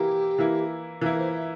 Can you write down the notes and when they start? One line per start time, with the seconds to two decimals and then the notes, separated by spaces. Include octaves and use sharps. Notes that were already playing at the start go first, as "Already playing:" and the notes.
Already playing: E3 A#3 E4 G4
0.39 E3 A#3 E4
1.01 E3 A#3 E4 A#4
1.18 C5
1.34 E5